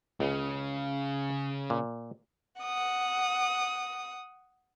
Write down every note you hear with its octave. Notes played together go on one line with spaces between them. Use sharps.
C#2 C#3
A#2
F#5 D#6